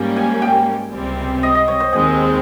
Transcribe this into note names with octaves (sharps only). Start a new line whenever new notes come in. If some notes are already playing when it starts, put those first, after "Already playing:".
Already playing: G#2 G3 A#3 C#4
G#5
G5
C#2 C3 G3 C4
D#5
D#5
C#5
C5
D#2 D#3 G#3 C4 G#4